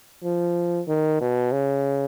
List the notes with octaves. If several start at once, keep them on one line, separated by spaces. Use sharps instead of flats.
F3
D#3
B2
C#3